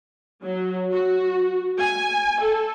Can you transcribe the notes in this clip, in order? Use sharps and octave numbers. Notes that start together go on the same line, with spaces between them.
F#3
F#4
G#5
A4